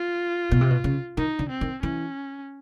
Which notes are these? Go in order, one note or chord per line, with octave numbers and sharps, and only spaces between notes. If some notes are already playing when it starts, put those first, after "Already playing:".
Already playing: F4
B2
C3
B2
C#3
D#3 D#4
D3
C4
D#3
E3 C#4